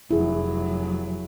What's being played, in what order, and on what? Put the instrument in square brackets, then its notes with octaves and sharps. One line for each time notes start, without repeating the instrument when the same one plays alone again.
[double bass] F1 F#3 [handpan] E4 G#4